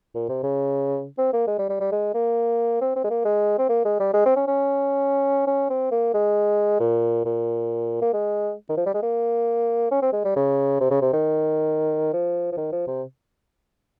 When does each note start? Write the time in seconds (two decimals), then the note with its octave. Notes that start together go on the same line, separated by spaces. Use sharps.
0.15 A#2
0.29 C3
0.44 C#3
1.18 C4
1.33 A#3
1.47 G#3
1.59 G3
1.69 G3
1.80 G3
1.92 G#3
2.14 A#3
2.81 C4
2.96 C4
3.04 G#3
3.10 A#3
3.25 G#3
3.58 C4
3.69 A#3
3.85 G#3
4.00 G3
4.14 G#3
4.26 C4
4.36 C#4
4.47 C#4
5.47 C#4
5.70 C4
5.91 A#3
6.14 G#3
6.80 A#2
7.25 A#2
8.02 A#3
8.13 G#3
8.69 D#3
8.77 F3
8.86 G3
8.94 G#3
9.02 A#3
9.91 C#4
10.02 C4
10.13 G#3
10.25 G3
10.36 C#3
10.80 C3
10.90 C#3
11.02 C3
11.13 D#3
12.13 F3
12.52 F3
12.57 D#3
12.72 F3
12.87 C3